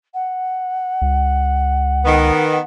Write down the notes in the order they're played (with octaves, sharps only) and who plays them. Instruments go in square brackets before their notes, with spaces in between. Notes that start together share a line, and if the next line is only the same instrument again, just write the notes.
[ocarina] F#5
[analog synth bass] C#2
[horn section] D#3 B3